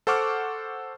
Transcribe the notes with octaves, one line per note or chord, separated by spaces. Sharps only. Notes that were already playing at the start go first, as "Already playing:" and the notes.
A4 C5 F#5 C#6 D6 F6